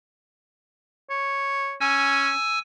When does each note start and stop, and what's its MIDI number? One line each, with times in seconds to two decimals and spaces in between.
1.10 1.75 73
1.80 2.31 61
1.80 2.59 80
1.80 2.59 88